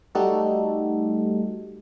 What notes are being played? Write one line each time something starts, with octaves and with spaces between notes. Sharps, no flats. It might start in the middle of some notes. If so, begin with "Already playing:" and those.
G3 A3 D#4 F#4 G4 A4